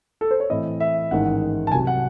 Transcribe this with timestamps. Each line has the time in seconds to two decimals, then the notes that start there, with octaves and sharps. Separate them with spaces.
0.21 A4
0.31 C5
0.40 C#5
0.50 A2 E3 C4 E4 D#5
0.80 E5
1.11 A1 G#2 D#3 G#3 D#4 F#5
1.67 A5
1.72 C2 C3 F#3 G#5
1.87 F#5